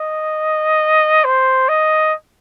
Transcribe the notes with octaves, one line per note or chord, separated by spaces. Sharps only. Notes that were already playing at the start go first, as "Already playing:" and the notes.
Already playing: D#5
C5
D#5